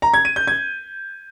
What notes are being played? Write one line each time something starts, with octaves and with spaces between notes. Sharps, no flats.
A#5
G#6
D#7
G6
G#6